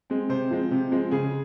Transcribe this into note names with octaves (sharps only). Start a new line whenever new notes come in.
G#3 C4
C3 C5
F3 G#3 C4
C3
F3 G#3 C4
C#3 G#4